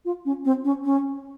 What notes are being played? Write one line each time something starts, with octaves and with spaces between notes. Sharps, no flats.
F4
C#4
C4
C#4
C#4